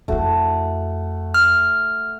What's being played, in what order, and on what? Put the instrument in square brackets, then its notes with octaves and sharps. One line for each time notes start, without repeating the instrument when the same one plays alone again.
[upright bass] F2 E4 [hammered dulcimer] A3 F#4
[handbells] F6